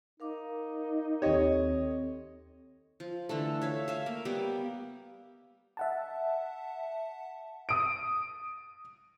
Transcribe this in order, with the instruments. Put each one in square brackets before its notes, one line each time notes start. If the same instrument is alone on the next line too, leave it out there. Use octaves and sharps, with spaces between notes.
[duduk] D#4 [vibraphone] A#4 F5 D6
[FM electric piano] D#2 G4 [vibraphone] C4 A4 [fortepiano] C#5 D#5
[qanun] F3
D3 E3 A3
C#5 E5 F5
E5 F5
A#3
G3 A#3 B3 G4
[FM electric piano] E5 F#5 A5
[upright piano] D#6 D7